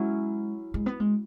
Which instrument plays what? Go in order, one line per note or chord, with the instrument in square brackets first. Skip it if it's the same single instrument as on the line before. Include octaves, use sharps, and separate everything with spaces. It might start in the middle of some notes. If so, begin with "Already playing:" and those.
Already playing: [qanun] F#3 C#4 E4 [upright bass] G#3
[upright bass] G#3
B3
G#3